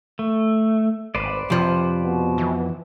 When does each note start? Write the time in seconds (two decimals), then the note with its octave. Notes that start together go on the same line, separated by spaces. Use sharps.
0.19 A3
1.15 G#1 B4 C5 D5
1.50 F2 C3 F3
2.03 B2
2.38 E3